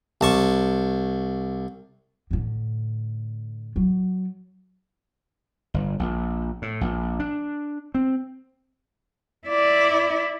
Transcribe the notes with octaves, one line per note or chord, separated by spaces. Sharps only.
C2 A5 C#6
A2 D3
F#3
G1
A#1
A2
A#1
D4
C4
E4 D5